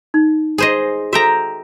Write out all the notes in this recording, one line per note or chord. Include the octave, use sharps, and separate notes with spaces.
D#4
G#4 C5 D#5
F#4 A4 E5 G5 A#5